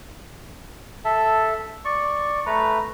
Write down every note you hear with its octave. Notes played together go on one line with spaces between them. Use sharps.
A4 E5 A5
D5 C#6
A3 B4 A#5